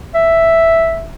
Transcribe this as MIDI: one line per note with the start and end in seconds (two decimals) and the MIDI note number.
0.15 1.07 76